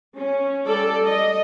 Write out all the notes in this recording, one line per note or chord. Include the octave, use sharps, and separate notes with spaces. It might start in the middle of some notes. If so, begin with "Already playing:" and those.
C#4
G3 A4 D5
D#5